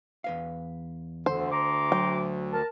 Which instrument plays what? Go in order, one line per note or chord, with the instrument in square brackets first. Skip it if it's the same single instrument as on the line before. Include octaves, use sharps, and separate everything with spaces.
[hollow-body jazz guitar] E2 B4 F5
[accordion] D2 [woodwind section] D3 [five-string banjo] C5
[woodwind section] A#5 C6 D6
[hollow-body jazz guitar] F#3 [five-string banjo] G5
[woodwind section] A#4 A5